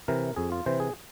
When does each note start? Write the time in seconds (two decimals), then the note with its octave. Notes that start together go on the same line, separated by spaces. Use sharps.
0.08 C3 E3 A#4
0.36 F2 G#4
0.52 F4
0.66 C3 E3 C5
0.80 G#4